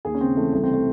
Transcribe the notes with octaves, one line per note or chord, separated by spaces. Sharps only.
D#2 G#4
C#4
C#3 C4
E3 A3
C2 A3
C4
C3 A3